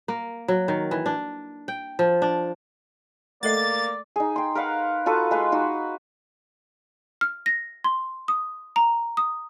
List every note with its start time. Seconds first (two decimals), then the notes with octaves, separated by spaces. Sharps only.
0.08 A#3
0.48 F#3
0.68 D#3
0.91 E3
1.06 D4
1.68 G5
1.99 F3
2.22 D4
3.43 A3 A#3 A4 D5 D#5 A6
4.16 D#4 G#4
4.36 G5 C6
4.55 A#4 B4 F5 F#5
5.06 F4 F#4 A4 B4
5.31 G#3 B4 F5 C6
5.52 D#4 F#4
7.21 F6
7.46 A#6
7.84 C6
8.28 D#6
8.76 A#5
9.17 D#6